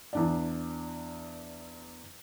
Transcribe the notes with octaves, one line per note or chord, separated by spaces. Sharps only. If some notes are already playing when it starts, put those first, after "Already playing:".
E2 D4 D5